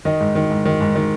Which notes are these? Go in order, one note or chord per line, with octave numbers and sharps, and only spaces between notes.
D#3 D#5
G#2
D#3
G#2
D#3
G#2
D#3